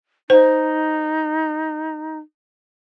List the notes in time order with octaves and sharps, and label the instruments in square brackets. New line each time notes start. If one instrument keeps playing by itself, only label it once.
[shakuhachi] D#4 [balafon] C5